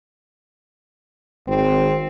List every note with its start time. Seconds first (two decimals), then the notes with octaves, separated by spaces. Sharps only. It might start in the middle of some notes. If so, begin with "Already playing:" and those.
1.48 G#1 C4